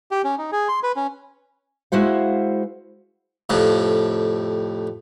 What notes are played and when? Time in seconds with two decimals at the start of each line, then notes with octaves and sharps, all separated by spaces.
0.11 G4
0.24 C#4
0.38 D#4
0.52 G#4
0.68 C6
0.83 B4
0.96 C#4
1.92 G#3 E4 F#4 C5 F5
3.50 F2 A2 C3